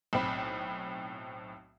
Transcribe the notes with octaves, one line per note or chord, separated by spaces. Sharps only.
B1 A2 C4 B5